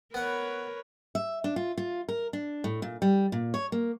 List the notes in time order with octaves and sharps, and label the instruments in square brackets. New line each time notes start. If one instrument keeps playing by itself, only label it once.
[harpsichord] B3 F#5 [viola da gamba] A#4 [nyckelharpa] B4 C#5
[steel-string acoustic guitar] E5
D4
F4
F4
A#4
D4
A2
A#2
G3
A#2
C#5
A#3